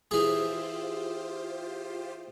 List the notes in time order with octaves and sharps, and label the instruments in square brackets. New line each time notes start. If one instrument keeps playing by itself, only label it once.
[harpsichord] E3 G#4 [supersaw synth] F4 G4 C5 [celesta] D#6